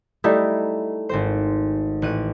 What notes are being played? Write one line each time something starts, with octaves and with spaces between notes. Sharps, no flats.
G3 A3 D#4 E4
G#1 C4 C5
A1 F#6 D#7